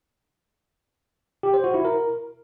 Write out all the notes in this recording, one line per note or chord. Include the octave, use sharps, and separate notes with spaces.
G4
C5
F#4
E4
A#4